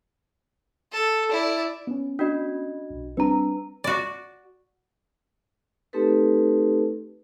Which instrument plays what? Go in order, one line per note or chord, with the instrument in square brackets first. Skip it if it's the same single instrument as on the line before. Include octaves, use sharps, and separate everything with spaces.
[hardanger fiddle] A4
E4 D5
[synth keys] B3 C#4
[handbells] D4 F#4 D#5
[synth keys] B1
[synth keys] G3 C4 D4 [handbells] B4 A#5
[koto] F#4 D5
[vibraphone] A3 C4 D#4 G4 A4 B4